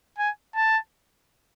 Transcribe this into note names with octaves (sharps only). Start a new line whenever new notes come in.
G#5
A5